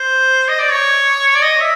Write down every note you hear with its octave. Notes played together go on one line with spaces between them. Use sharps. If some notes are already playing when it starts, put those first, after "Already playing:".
Already playing: C5
D#5
D5
C#5
D5
D#5
E5